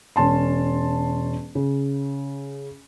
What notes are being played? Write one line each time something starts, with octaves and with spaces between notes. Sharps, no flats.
E1 C#4 A5 C6
C#3